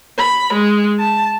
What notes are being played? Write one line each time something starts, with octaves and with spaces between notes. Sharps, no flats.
B5
G#3
A5